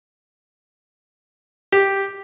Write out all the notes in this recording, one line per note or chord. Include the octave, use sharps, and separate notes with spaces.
G4